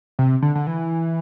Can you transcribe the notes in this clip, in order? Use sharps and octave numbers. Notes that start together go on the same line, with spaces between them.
C3
D3
D3
E3